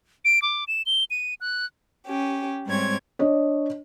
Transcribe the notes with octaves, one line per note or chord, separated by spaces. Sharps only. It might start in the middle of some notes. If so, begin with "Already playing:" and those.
D7
D6
E7
G7
D#7
F#6
C#4 G4
G#2 G3 C4 C#5 G#6
D4 C#5 D#5